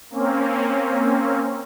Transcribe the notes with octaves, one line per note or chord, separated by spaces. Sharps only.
A#3 C4 C#4